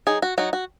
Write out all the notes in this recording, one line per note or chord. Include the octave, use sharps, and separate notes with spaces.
F#3 D#4 G#4
F#4
F#3 D#4 F#4
F#4